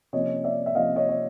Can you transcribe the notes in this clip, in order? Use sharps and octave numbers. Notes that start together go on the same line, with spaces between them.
C3 F3 A#3 C#4 C#5 D#5
D5 E5
E5
C3 F3 A#3 C#4 D#5 F5
C#5 D#5
C#5